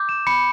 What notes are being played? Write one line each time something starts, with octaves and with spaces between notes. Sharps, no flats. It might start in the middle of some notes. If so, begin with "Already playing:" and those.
Already playing: D6 G6
E7
B5 C#7